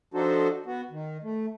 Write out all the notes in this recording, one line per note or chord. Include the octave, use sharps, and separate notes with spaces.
F3 D4 D#4 F#4 A4 C5
B3 F#4
D#3
A3